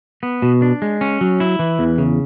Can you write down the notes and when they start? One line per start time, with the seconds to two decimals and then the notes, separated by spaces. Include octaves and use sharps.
0.23 B3
0.42 B2
0.62 D4
0.82 G#3
1.01 C#4
1.21 F#3
1.40 E4
1.59 E3
1.79 E2
1.98 C#3